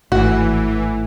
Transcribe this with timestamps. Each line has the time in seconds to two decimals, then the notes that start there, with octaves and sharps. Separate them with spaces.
0.12 G#1 A2 E3 F#4